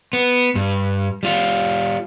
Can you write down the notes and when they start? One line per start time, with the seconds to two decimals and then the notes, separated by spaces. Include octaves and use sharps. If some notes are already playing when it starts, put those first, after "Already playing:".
0.13 B3
0.55 G2
1.23 G3 F4